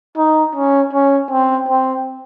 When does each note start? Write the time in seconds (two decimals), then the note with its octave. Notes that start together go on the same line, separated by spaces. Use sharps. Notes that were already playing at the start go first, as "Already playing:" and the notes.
0.17 D#4
0.55 C#4
0.93 C#4
1.30 C4
1.69 C4